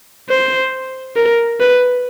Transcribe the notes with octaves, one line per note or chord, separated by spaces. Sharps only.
C5
A#4
B4